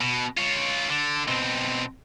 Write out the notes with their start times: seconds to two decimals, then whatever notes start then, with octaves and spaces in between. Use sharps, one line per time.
0.01 B2
0.38 F4 C#5
0.90 D3
1.28 B2 C4